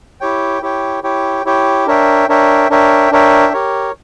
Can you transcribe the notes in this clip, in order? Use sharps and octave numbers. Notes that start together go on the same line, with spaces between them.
E4 G4 C#5 G5
E4 G4 C#5 G5
E4 G4 C#5 G5
E4 G4 C#5 G5
D4 A#4 C#5 E5 G5
D4 A#4 C#5 E5 G5
D4 A#4 C#5 E5 G5
D4 A#4 C#5 E5 G5
G4 A#4 C#5